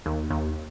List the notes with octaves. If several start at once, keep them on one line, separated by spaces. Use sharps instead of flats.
D#2
D#2